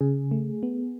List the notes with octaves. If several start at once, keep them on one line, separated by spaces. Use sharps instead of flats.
C#3 G#4
A3
B3